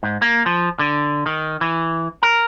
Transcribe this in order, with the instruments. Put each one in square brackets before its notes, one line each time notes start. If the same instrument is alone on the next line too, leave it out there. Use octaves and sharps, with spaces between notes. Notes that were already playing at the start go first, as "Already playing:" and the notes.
[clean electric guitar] G#2
A#3
F3
D3
D#3
E3
A#4